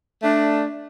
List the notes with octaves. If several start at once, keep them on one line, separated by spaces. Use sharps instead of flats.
A3 D4